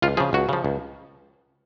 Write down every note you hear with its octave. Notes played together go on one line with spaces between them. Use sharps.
C#2 F4
C#3 F3 G#4
C#2 F#4
C#3 F3
C#2